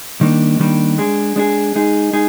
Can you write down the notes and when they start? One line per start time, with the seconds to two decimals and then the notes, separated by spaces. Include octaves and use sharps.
0.21 D#3 G3 A#3 D4
0.60 D#3 G3 A#3 D4
0.98 G#3 D4 G#4
1.36 G#3 D4 G#4
1.76 G#3 D#4 G#4
2.13 G#3 D#4 G#4